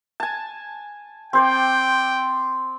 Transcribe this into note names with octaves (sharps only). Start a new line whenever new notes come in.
G#5 A5
C4 C5 D5 G5